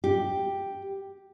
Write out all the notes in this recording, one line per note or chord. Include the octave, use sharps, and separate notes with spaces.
G4